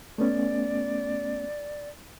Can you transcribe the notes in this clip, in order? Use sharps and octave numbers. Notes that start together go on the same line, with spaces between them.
A3 B3 C#4 D5